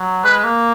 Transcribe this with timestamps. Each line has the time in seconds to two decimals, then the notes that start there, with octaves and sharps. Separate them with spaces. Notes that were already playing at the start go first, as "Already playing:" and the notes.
Already playing: F#3
0.24 G#3 B4
0.44 A#3